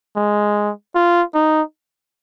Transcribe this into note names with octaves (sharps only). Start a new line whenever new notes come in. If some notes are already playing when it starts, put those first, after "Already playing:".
G#3
F4
D#4